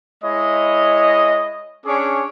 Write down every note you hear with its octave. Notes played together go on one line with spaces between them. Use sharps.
G#3 E4 C#5 D#5
C#4 D4 G#4 C#5 C#6 D6